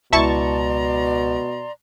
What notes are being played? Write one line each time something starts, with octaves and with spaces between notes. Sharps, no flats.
C#2 B2 E4 D5 A5 A#5 C6 C#6